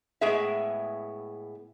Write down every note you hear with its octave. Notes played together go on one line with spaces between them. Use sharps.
A2 G#3 B3 G#4 E5